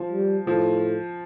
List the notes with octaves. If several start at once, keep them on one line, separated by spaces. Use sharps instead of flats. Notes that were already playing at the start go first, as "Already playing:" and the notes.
Already playing: F3
G3
A2 F3